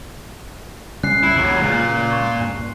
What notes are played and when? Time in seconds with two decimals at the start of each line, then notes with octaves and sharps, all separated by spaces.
1.03 C#3 G3 C#4 F#6 C7
1.23 C2 F#2 E4
1.37 D#2 F#3
1.61 A#2 C#3 G#3
2.12 C#6
2.41 D#1 G2